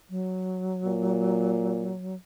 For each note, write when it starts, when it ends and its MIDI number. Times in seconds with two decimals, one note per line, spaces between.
0.10 2.15 54
0.85 1.92 46